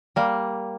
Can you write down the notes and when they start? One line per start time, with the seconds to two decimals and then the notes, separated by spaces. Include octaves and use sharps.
0.16 G3 A#3